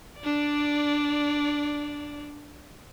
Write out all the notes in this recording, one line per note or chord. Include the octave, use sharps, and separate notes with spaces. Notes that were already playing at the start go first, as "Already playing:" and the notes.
D4 D5